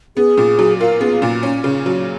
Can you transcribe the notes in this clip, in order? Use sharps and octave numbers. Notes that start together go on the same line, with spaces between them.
B3 G#4
A#2
F#3
F4 A#4
B3 G#4
A#2
C#4
C#3
F#3